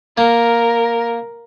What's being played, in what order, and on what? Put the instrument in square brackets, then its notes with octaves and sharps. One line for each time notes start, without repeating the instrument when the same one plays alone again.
[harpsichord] A#3 [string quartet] A#4